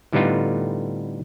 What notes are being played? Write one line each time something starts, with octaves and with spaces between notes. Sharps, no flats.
A2 D3 G3 B3 D#4 F4